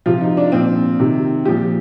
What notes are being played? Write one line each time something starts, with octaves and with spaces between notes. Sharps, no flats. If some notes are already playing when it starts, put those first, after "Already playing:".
C3 F3 F4
D#4
D4
A#2 F3 C4
C3 D#3
A#2 F3 G4